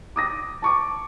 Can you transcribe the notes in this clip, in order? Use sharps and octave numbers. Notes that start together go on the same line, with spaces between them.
D6 D#6 A#6
A5 C#6 D6